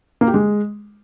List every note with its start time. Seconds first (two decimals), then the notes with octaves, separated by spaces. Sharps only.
0.21 A#3
0.28 G4
0.34 G#3